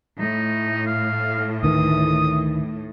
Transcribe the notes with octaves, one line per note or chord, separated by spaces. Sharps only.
A2 D#4
F5
D2 D#3 E3 D#6